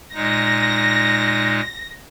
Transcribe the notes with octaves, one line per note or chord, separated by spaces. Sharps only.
A#2 G#3 D#4 A#6